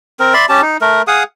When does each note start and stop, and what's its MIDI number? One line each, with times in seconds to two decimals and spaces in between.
0.20 0.34 60
0.20 0.34 70
0.34 0.46 74
0.34 0.46 76
0.34 0.46 83
0.34 0.46 84
0.49 0.61 61
0.49 0.61 67
0.49 0.61 81
0.62 0.77 63
0.81 1.02 57
0.81 1.02 70
1.07 1.23 68
1.07 1.23 77
1.07 1.23 78
1.07 1.23 87